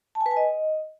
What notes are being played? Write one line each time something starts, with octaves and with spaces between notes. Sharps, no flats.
A5
G#5
B4
G#5
D#5